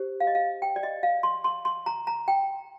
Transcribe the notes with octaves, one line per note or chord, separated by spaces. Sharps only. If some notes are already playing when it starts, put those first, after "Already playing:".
Already playing: G4 C5
F5
D#5
F5
G5
D5
D#5
F5
C6
C6
C6
A#5
A#5
G5